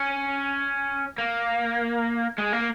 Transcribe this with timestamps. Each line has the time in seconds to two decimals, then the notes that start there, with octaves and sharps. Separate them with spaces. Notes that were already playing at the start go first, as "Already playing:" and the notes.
Already playing: C#4
1.18 A#3
2.38 G#3
2.53 A#3